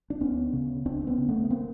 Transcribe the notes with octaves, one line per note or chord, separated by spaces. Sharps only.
D4
D2 B3 C#4
C#3
D2 C4 D4
C4
B3 C#4
C#3
A3 B3
B3
A#3 C4